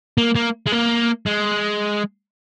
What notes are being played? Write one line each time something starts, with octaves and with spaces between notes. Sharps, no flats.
A#3
A#3
G#3
A#3
G#3